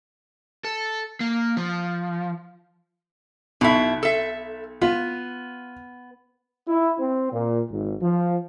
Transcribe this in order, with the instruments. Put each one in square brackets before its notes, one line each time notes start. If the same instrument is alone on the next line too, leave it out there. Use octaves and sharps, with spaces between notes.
[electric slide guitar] A4
A#3
F3
[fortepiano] B1 [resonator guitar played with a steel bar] B2 E4
[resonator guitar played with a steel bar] A4 E5
[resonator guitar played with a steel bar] B3 [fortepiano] F4
[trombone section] E4
C4
A#2
G#1
F3